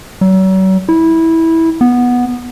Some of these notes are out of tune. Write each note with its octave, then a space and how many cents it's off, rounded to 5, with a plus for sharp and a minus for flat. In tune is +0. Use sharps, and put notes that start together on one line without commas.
F#3 +40
E4 -15
B3 -10